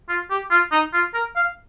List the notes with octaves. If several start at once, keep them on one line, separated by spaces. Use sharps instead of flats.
F4
G4
F4
D#4
F4
A#4
F5